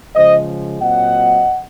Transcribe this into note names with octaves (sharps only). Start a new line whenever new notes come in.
C#3 F3 G#3 C5 D#5
A#2 F#3 C4 D#5 F#5